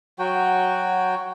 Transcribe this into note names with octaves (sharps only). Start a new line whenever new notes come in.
F#3 F#4 G5